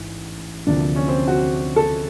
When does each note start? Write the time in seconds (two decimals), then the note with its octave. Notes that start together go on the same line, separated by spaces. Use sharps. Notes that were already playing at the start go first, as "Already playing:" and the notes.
Already playing: A1 G#2 E3
0.66 D2 C3 F3 A#3 D4
0.96 C#4
1.08 C4
1.27 F#4
1.76 A4